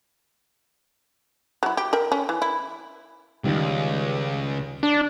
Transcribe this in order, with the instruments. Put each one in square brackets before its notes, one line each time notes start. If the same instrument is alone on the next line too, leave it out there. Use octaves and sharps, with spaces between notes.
[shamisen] F#3 E4
G4
A#4 E5 G5
C#4
E3
E4
[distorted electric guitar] C#2 [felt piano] D#3 G3
[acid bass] D4